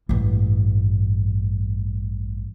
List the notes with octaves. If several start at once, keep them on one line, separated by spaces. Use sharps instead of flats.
A1 G2